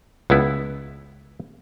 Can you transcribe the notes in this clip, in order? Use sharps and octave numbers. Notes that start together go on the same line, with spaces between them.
C#2 B3 E4